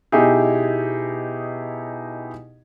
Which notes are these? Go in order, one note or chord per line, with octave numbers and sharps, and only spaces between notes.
B2 D#4 E4 G4 G#4